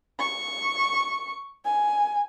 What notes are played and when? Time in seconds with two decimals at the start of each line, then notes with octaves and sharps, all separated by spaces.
0.19 C#6
1.65 G#5